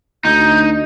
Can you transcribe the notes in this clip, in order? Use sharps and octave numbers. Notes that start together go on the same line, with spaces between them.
D2 D#4 G6